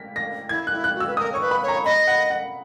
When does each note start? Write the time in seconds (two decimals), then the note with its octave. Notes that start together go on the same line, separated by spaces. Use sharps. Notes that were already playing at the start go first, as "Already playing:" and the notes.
Already playing: A#6 B6
0.16 A#6
0.49 E4 G#6
0.67 F#6
0.73 E4
0.84 F#6
0.95 F#4
1.00 E6
1.07 B4
1.17 A#4 D#6
1.32 C#5 C#6
1.41 B4
1.51 B5
1.63 C#5
1.68 A#5
1.85 D#5 B5
2.07 F#5
2.30 F#5